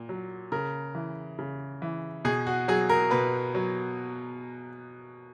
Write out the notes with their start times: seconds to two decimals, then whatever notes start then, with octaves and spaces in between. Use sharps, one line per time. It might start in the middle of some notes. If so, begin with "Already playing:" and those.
Already playing: A#2
0.09 F#3
0.52 C#3 A#4
0.95 E3
1.39 C#3
1.82 E3
2.25 B2 G#4
2.47 F#4
2.68 F#3 G#4
2.89 A#4
3.11 B2 B4
3.55 F#3